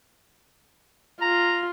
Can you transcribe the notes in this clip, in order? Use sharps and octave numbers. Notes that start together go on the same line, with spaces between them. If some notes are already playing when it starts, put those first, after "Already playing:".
F4 A#5